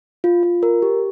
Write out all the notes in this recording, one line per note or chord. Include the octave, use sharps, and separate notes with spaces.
F4
F4
A#4
G4